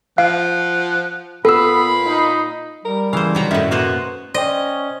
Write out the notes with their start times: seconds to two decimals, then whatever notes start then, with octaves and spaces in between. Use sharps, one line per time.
0.18 F3 F5 F#5
1.45 A#2 B3 A4 B5 E6
2.07 D#4
2.85 G3 A#4
3.13 C#3 E3 C5 F5
3.35 D#3 F#3 A#5
3.51 F#2 A2 C#4 D#4 E5
3.71 B2 A#3 B3 F#4 C5
4.34 C#4 C5 D5 D#5 G5